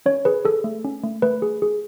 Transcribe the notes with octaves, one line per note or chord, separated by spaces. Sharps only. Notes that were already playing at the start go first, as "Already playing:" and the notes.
C#4 C#5
G#4 B4
G#4 A4
A3
C#4
A3
A3 B4
G#4
G#4